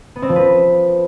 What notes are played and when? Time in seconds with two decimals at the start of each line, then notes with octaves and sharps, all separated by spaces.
0.16 B3
0.22 C4
0.29 F3
0.36 B4